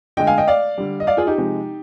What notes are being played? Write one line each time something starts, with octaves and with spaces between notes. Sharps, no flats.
D3 G#3 D#5 G5
F5 G#5
D#5 G5
D5 F5
D3 G3
D#5
D5 F5
F4 G#4
D#4 G4
C3 F3 G#3